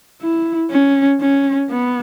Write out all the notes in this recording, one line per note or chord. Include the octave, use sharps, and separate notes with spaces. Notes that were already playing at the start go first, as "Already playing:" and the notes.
E4
C#4
C#4
B3